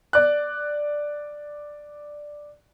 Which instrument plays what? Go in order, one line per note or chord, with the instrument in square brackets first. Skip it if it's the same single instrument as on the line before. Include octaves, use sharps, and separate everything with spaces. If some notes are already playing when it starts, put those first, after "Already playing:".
[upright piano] D5 F#6